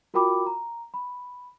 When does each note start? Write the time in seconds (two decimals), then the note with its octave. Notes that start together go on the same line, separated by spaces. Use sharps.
0.14 F4 F#4 A#4 G5 B5 D6
0.46 A#5
0.94 B5